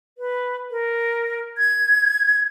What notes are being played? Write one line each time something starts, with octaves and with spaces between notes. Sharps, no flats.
B4
A#4
G#6